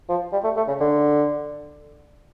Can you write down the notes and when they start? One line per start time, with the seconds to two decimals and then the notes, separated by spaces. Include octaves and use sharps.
0.09 F3
0.32 G3
0.44 A3
0.56 A3
0.68 C#3
0.80 D3